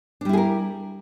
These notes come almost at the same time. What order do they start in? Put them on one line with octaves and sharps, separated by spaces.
D4 G3 E4 G#4 A#4